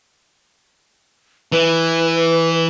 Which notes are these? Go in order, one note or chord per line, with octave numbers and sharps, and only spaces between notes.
E3 B4